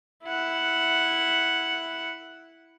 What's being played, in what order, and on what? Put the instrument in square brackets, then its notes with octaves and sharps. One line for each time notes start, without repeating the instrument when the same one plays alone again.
[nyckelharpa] E4 F#5